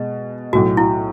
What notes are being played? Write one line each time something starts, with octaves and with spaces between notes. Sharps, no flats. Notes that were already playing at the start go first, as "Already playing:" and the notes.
Already playing: B2 G#3
B1 A2 F#3 F#4
E4